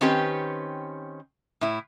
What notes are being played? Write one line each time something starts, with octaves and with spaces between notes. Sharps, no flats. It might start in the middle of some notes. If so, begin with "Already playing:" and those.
D#3 C4 C#4 G4 B4
A2 E4